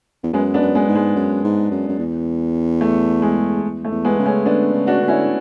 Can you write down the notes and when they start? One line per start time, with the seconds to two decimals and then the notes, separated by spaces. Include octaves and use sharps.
0.23 E2
0.33 F#2 G#3 B3
0.54 B3 D4
0.61 F#2
0.75 G#3 B3
0.88 G#2
0.95 G#3
1.16 F#2
1.44 G#2
1.71 F#2
1.89 F#2
1.99 E2
2.81 A3
3.22 G#3
3.63 E2
3.85 A3
3.91 E2
4.05 G#3 B3
4.19 C#3
4.26 A3 C#4
4.46 D3 B3 D4
4.73 C#3
4.87 D4 F#4
5.01 D3
5.08 C#4 E4